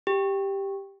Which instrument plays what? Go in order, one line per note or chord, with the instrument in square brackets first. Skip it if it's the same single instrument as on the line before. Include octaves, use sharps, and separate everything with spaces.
[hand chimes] G4